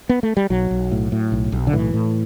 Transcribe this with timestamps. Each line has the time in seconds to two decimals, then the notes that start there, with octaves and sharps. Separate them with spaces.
0.09 B3
0.23 A3
0.37 G3
0.50 B1 F#3
0.71 B1
0.92 A2
1.12 A2
1.32 B1
1.52 B1
1.67 D3
1.73 A2 E3
1.94 A2